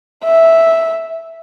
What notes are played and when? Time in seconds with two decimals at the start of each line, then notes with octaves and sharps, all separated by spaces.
0.24 E5